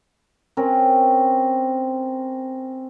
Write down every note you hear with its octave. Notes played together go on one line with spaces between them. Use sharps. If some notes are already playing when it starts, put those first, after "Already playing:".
C4 C#4 A#4